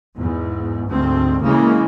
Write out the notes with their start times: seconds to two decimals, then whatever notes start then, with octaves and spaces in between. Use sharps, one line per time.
0.18 E2 G#2
0.89 D2 G#2 C4
1.44 C#3 E3 G#3 A#3